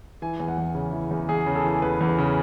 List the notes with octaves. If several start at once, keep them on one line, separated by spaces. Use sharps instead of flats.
E3 G#5
E2
F#5
E2
C#3
E3
E2
E2 G#4
C#3
A4
E3
E2 B4
E2
B4
C#3